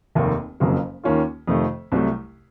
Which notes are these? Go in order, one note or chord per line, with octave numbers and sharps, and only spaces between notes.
F1 D#2 D#3 A#3
F#1 F2 C#3 F#3 A#3
D#2 D#3 A#3 C#4 F4
F2 C3 D#3 A3
C2 C3 F#3 A3